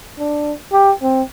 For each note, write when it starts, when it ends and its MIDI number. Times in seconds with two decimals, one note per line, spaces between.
0.19 0.52 62
0.72 0.91 67
1.02 1.22 60